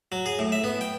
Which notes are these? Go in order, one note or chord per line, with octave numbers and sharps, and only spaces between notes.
F#3
G#4
A2
E5
B3
G5